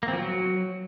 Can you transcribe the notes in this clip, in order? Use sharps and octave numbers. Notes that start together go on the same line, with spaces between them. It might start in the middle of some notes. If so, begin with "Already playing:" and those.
A#3
C4
F3
F#3